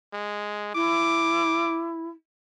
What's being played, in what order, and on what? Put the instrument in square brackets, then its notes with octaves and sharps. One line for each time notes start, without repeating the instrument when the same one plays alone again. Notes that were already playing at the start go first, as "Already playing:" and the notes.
[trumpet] G#3
[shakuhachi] E4 [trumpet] D6